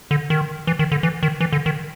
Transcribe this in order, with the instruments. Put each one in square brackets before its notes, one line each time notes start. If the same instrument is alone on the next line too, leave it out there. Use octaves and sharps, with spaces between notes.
[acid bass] D3
D#3
E3
D#3
D3
E3
D#3
E3
D3
D#3